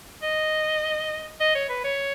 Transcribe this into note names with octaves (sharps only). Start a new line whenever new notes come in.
D#5
D#5
C#5
B4
C#5